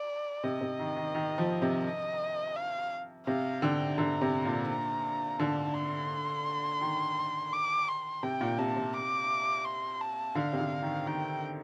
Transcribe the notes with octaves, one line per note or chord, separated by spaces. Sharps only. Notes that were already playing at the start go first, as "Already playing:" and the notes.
Already playing: D5
C3 D#5
C3
D#3
D#3
D#3
F3
C3
D#5
F5
C3 F5
D3 G5
D3 A#5
C3
A#2
A#5
D3 A5
C6
D#3
D6
C6
C3 G5
A#2
C3 A5
C3
D6
C6
A5
D3 F5
C3
D3
D#3
D#3 G5